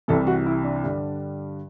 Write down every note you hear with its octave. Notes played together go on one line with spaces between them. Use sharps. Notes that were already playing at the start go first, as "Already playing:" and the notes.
C2 C3 E3 A4
F#4
E4
D4
G2 D3 G3